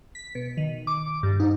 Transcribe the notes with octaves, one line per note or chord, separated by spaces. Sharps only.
B6
B2
D#3
D6
G2
D#4